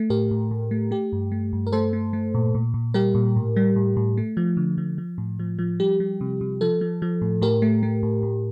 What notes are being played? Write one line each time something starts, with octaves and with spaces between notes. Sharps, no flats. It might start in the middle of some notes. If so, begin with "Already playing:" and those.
Already playing: A3
A2 G4 A#4
A2
A2
A3
A3 G4
G2
A3
G2
A#4
A3 A4 C5
A3
A3
A#2
A#2
A#2
G3 G4 A#4
A#2
A2
G3
A2
A2
A3
F3
D3
F3
F3
A2
F3
F3
G3 G4
G3
C3
C3
F3 A4
F3
F3
A2
A2 G4 A#4
A3
A3
A2
A2